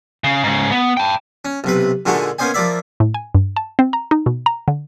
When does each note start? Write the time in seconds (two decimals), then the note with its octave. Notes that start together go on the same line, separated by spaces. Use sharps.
0.24 C#3
0.44 G#2 C#3
0.72 B3
0.97 G5 A5
1.45 C#4
1.64 B1 C3 B4
2.06 A#2 D3 G#3 A3 D#4 F#4
2.39 A#3 B3 C#4 C5 D#5 G#5
2.54 F3 A#3 D5 E5
3.00 A2
3.14 G#5
3.35 G2
3.57 A5
3.79 C4
3.93 A#5
4.11 D#4
4.26 B2
4.46 A#5
4.68 D3